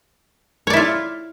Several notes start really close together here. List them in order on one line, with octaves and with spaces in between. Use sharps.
C#5 D5 E4 F4